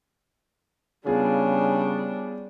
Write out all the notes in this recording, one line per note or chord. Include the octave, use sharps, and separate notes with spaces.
C#3 G3 B3 D4 F4 G#4